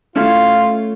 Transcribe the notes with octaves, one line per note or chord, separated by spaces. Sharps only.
A3 C#4 E4 F4 A4